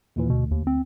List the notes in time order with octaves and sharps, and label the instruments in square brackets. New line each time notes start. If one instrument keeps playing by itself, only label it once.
[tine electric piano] D#2 A#2 E3
[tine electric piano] D2 [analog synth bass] B2
[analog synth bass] D#2
C4